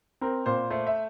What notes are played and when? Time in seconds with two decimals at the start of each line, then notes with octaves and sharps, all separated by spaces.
0.21 C4 A#4
0.46 A#2 C5
0.70 A3 C5
0.87 E5